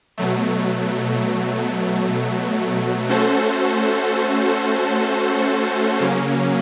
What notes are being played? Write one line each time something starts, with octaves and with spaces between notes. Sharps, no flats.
B2 F#3 A3
A3 C#4 F#4 A4 C5
C#3 F#3 A#3 C#4